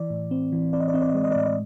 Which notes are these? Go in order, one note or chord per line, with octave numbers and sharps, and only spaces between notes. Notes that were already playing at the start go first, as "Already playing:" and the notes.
Already playing: E3 D5
A2
C4
E3
C4 D5
D#5
D5
C4 D#5
D5
D#5
G#3 D5
D#5
D5
A2 D#5
D5